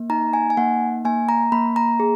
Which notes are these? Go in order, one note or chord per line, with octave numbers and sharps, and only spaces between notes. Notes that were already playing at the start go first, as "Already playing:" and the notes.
Already playing: A#3
D#4 A#5
G#5
G#5
A#3 F#5
A#3 G#5
A#5
A#3 B5
A#5
G#4